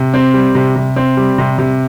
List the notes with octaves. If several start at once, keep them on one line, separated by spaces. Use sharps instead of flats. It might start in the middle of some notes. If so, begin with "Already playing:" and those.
Already playing: C3
C4
G3
C3
C3
C4
G3
C3
C3